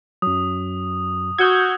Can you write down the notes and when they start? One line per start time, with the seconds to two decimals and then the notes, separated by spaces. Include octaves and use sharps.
0.22 F#2 F#3 D#6
1.38 F#4 D#6 E6 G6 G#6